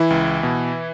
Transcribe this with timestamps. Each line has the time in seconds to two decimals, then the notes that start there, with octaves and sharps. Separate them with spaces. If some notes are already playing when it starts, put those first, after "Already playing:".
Already playing: E3 E4
0.10 C#2
0.43 B2